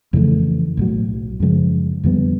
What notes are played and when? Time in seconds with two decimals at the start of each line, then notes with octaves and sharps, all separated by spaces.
0.13 F2 C#3 E3 A3
0.77 B1 A2 F#3
1.40 F#2 C#3 F3 G#3
2.04 F2 D3 G3 B3